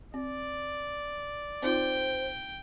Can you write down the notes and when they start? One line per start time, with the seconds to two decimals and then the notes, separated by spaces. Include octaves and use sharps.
0.14 C4 D5
1.62 C4 D#4 F4 C5 G5